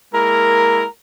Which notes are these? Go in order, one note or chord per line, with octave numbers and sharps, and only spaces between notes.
G#3 A#3 E4 A#4